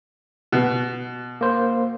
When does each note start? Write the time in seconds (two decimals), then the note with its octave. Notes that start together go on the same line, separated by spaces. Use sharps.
0.52 B2
1.41 A#3 C5